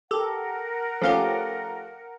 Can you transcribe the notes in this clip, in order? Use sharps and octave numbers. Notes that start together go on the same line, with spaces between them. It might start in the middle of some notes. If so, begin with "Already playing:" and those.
G4 A4 A#4 F#5
F3 A3 C#4 G4 F5